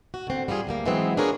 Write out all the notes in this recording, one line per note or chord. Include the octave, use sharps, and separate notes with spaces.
F#4
D3 C4
G3 E4 F4 G#4
D2 G3 A#3
D#3 E3 F#3 G#3 B3 C4
D4 F4 G#4 A#4 B4 C#5